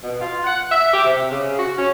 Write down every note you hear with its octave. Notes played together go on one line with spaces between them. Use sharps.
B2
F4
F#5
E5
G4
C3
C#3
F#4
C#4